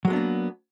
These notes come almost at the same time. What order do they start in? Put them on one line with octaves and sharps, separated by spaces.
F#3 G#3 B3 D4 A#3